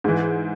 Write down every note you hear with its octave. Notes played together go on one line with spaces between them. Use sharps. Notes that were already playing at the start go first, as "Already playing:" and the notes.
G#2 E3